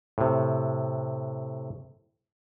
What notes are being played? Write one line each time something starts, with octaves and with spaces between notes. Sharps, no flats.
A2 C3